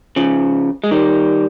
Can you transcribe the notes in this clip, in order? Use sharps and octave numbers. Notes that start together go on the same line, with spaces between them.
C#3 F3
G#3
D#3 G3